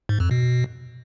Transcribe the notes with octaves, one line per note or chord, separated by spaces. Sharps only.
G#2
F2
B2